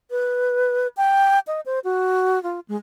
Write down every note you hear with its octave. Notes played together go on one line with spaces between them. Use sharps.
B4
G5
D#5
C5
F#4
F4
G#3